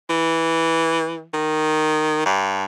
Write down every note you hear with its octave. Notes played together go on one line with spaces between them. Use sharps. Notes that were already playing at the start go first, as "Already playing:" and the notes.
E3
D#3
G2